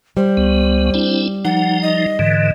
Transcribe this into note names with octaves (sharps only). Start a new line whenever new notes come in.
G3 C5
C#2 B3
C4 D4 E4
F3 D#4 F#5
D#5
G#2 D3 E3